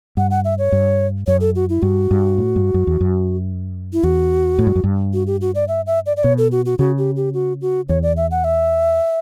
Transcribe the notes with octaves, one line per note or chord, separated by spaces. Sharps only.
G2 F#5
F#5
E5
C#5
G2
F#2 C#5
A4
F#4
E4
G2 F#4
G2
A2
G2
F#2
E2
F#2
E4
E2 F#4
A2
G2
F#2
G2
F#4
G4
F#4
D5
E5
E5
D5
D5
B2 C#5
A4
F#4
F#4
C#3 F#4
G4
G4
F#4
F#4
E2 C#5
D5
E5
F#5
E5